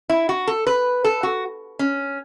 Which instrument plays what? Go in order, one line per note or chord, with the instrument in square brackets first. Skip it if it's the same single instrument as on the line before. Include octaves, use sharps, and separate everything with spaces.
[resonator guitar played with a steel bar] E4
F#4
A4
B4
A4
F#4
C#4